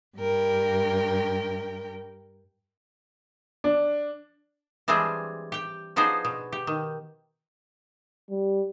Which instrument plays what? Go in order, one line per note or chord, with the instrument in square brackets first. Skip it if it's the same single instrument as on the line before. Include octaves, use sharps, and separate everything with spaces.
[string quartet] G2 A#4 G5
[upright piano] D4
[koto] E3 G3 G#3 C4 D4 G#4
G4 G5
F3 B3 D4 D#4 G#4 C5
B2
G4
D#3
[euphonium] G3